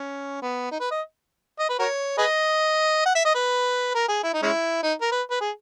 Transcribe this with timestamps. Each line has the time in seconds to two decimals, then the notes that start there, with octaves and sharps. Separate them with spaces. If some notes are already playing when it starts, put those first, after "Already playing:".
Already playing: C#4
0.42 B3
0.71 D#4
0.80 B4
0.91 D#5
1.59 D#5
1.69 B4
1.79 F#4 A#4 C#5
2.18 G#4 B4 D#5
3.06 F#5
3.15 E5
3.25 D#5
3.35 B4
3.95 A#4
4.08 G#4
4.23 E4
4.33 D#4
4.43 G#3 C#4 E4
4.83 D#4
5.01 A#4
5.12 B4
5.31 B4
5.41 G#4